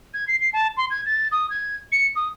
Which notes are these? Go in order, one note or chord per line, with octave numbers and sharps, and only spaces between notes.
G#6
C7
C7
A5
C6
G#6
A6
D#6
G#6
C#7
D#6